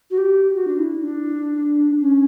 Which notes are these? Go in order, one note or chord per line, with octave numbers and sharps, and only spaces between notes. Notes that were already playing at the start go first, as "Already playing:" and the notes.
F#4
G4
F#4
D4
E4
D4
C#4